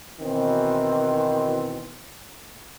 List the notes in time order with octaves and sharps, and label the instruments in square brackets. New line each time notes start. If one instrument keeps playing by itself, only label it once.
[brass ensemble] B2 D#3 E3 C4